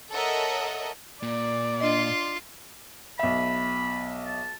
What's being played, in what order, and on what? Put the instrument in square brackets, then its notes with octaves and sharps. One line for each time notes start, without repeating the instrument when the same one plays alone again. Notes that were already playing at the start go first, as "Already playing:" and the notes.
[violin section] A4 A#4 C#5 D#5 E5 F#5
[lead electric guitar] A#2 [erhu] D5
[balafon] D4 D#5 [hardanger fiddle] F4 C6
[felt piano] B1 E5 [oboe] B5
[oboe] A5